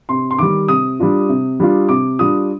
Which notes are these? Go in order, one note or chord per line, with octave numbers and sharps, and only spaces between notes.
C3 C6
C6
D#3 G3 D6
C3 D#6
G3 D4 F4
C3
G3 D4 F4
C3 D6
G3 D4 F4 D#6